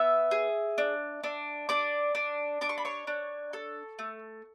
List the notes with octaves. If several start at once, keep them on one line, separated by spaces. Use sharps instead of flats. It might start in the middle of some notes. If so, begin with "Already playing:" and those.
Already playing: B3 E5 E6
G#4
D4
D4
D4 D5 D6
D4
D4 D6
C#6
B5
C#5 C#6
D4
A4
A3